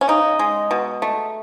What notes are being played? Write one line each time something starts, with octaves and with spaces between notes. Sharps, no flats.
C#4
C#3 D#4
G#3
B2
A3